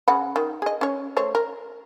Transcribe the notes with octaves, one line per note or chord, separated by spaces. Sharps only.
C#3 F#5 B5
D#3
G#4 D#5
C#4 C#5
A3 C5 C#5
A#4